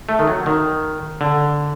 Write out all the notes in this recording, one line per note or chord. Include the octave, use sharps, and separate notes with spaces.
A3
D#3
F#3
D#3
D3